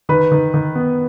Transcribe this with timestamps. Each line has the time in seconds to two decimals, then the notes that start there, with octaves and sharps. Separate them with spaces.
0.09 D#3 B4
0.32 D#3
0.54 D#3
0.75 B3